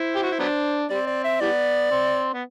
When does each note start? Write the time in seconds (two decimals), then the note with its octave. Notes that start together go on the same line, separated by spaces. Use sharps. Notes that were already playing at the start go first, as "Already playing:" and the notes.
Already playing: E4 C5
0.16 G4
0.23 F#4
0.31 E4
0.39 F#3 B3 D4
0.89 G3 C4 D5
1.07 D5
1.24 E5
1.40 E3 G3 B3 D5
1.91 C4
2.33 B3